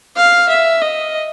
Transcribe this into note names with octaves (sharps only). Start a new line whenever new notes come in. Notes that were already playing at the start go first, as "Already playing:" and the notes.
F5
E5
D#5